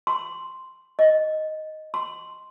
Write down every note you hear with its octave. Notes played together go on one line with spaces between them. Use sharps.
C6
D#5
C6